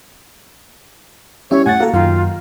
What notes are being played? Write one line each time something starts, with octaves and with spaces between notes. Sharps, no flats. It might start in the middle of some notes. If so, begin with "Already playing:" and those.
G3 C#4 E4 C#5 E5
A2 F#5 G#5 A6
A#3 F#4 A4
F#2 D#3 A#3 F4